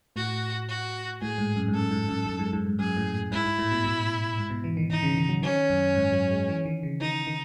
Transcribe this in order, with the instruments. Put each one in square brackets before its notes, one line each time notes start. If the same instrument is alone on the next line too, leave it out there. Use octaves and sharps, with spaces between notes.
[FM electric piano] A2 [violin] F#4
[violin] F#4
[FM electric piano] A2 [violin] G#4
[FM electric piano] G#2
F#2
G#2
[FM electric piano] F#2 [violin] A4
[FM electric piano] G#2
F#2
F#2
G#2
G#2
G#2
[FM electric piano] F#2 [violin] G#4
[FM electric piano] A2
[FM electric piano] G#2 [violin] E4
[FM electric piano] G#2
A2
B2
A2
G#2
B2
E3
D#3
[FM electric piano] E3 [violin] D#4
[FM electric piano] C#3
D#3
F#3
[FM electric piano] D#3 [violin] C#4
[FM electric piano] F#2
G#2
F#3
G#3
E3
D#3
C#3
[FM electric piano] D#3 [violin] D#4
[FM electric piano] D#3